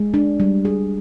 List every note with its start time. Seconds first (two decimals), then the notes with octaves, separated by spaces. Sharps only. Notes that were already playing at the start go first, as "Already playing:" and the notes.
Already playing: G#3
0.14 D4
0.40 G3
0.65 G#4